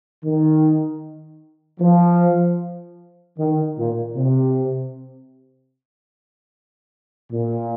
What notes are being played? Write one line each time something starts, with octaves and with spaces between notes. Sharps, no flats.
D#3
F3
D#3
A#2
C3
A#2